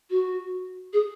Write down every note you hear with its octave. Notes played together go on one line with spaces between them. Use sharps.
F#4
G#4